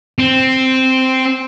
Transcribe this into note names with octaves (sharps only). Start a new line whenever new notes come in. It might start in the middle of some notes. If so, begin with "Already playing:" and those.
C4